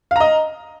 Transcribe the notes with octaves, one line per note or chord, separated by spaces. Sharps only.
D#5 F5 A#5